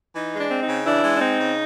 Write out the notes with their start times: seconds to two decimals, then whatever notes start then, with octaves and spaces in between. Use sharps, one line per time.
0.16 E3 D#4
0.34 G#3
0.39 D4
0.51 C4
0.63 D#4
0.69 C#3
0.86 E3 D4 E4
1.04 G#3
1.17 D4
1.21 C4 D#4
1.39 C#3